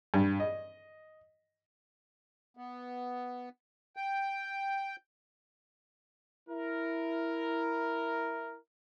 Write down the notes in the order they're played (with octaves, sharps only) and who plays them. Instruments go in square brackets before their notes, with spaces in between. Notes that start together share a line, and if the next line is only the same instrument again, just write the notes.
[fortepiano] G2
D#5
[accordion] B3
G5
[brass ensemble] E4 A#4